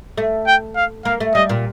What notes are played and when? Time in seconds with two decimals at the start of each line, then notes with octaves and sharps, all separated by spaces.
0.18 A3
0.47 G5
0.76 F5
1.05 A#3 F5
1.20 A3
1.35 G3 D#5
1.49 A#2